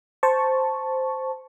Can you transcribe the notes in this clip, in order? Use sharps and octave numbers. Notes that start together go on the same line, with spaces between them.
C5 A5 C#6